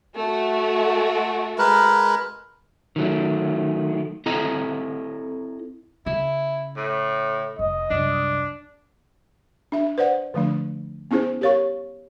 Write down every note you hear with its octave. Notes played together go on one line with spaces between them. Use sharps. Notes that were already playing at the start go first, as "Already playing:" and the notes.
A3 F#4
G#3 A#4 B4
D#3 F#3 A3
C4 E4 A4 D#5 A#5
C#3 E4
A2
F1 D#5
C2 F#2 D4
D4 E5
B4 C5 D5 F#5
D3 F3 A3 D4
B3 C#4 E4 G#4 C5
G4 A#4 C#5 F5 C#6